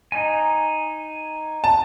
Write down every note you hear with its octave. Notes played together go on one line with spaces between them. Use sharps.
D#4 G#5
A5